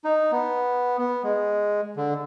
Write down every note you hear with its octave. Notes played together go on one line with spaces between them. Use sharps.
D#4
B3
B3
G#3
D3